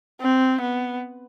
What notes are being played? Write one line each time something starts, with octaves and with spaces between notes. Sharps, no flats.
C4
B3